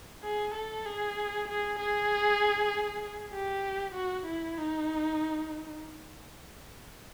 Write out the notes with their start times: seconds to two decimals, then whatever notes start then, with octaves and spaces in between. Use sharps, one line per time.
0.23 G#4
0.55 A4
0.86 G#4
1.48 G#4
1.79 G#4
3.34 G4
3.95 F#4
4.26 E4
4.57 D#4